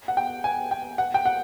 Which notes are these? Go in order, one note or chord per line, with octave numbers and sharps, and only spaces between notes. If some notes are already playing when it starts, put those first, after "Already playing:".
F#5
G5
G#5
G5
F#5
G5
F#5